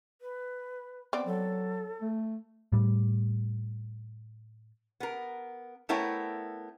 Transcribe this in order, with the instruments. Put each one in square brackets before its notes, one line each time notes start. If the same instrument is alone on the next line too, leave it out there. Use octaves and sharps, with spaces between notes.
[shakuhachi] B4
[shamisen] B3 C4 D5 [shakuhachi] G5
[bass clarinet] F#3 [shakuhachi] A4
[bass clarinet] A3
[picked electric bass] A2 G3
[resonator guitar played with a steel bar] B3 A#4
A3 B3 E4 A#4 C#5 G5